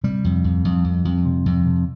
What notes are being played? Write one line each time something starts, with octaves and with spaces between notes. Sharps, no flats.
C3 G3
F2
F2
F2
F2
F2
C3
F2
C3